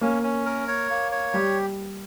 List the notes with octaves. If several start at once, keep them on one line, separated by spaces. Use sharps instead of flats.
A#3 C#4
C#4
A#4
C#5
A#3
C#5
G3 G4